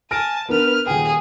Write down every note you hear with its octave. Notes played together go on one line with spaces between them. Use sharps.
G#5 A5 F6 A#6 D7
B3 D4 A#4 B4 F6
D#1 G#4 G5